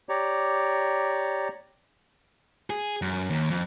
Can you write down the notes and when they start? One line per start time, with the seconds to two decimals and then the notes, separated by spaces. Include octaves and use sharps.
0.09 G4 C#5 D5 A#5
2.70 G#4
3.02 F#2
3.30 D#2
3.50 F2